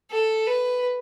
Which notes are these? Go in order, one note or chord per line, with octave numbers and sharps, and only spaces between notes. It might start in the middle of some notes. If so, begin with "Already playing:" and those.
A4
B4